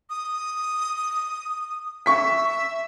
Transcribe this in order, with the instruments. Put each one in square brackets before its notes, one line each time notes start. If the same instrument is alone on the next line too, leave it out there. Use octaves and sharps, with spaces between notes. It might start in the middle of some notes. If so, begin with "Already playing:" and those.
[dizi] D#6
[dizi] E5 [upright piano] C#6 B6